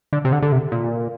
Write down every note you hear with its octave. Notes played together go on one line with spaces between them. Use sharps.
D3
C3
D3
D3
C3
A#2